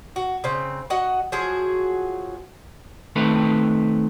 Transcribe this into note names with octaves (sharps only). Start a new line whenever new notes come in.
F#4
C#3 C4
F#4 D#5 F#5
F3 F#3 F#4 G#4
D#3 A3 C4 B4 F5